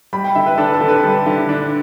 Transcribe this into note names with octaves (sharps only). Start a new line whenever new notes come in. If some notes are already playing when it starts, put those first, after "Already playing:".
G3 B5
G5
D3 E5
B4
D4 A4
A4
D3
B4
G3 A4
D3
D4